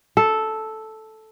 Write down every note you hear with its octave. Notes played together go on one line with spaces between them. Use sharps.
A4